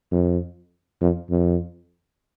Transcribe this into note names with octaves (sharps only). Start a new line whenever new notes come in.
F2
F2
F2